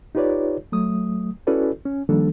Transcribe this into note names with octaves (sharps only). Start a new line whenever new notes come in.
D#4 F4 G4 B4 C#5 D5
F#3 A3 D#6
C#4 E4 F#4 A4 B4 D5
C#4
D#3 F3 G3 A#3 D4 A4